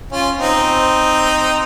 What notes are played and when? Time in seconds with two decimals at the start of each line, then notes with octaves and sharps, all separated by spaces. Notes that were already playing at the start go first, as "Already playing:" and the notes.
0.12 C#4 F4
0.38 C4 D#4